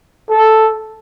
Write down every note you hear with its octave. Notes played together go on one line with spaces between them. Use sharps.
A4